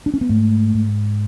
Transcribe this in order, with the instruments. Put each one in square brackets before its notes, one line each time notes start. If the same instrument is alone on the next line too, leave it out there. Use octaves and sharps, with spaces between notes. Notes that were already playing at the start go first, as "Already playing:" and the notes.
[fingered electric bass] D4
C#4
B3
G#2 A3
G#2